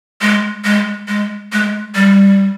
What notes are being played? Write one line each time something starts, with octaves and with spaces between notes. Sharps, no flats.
G#3
G#3
G#3
G#3
G3